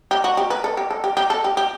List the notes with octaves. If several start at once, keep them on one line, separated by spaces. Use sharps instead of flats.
G4
F#4
G4
B4
A4
G4
A4
G4
G4
A4
G4
G4